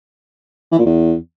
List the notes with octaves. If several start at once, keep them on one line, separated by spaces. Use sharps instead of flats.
E3
A#2
E2